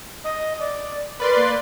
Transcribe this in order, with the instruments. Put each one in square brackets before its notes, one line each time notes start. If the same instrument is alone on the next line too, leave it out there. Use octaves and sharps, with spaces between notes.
[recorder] D#5
D5
[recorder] A#4 [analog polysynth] B4 D5 C6
[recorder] A#3